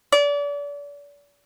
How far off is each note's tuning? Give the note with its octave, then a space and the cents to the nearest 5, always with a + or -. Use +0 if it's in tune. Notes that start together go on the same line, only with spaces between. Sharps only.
D5 -35